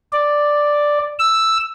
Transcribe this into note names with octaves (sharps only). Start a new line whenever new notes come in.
D5
E6